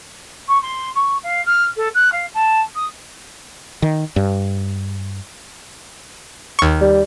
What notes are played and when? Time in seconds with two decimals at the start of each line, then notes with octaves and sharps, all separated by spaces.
0.48 C#6
0.62 C6
0.95 C#6
1.23 F5
1.46 F6
1.76 A4
1.94 F#6
2.12 F5
2.34 A5
2.75 D#6
3.82 D#3
4.16 G2
6.59 D#2 C#6
6.81 G3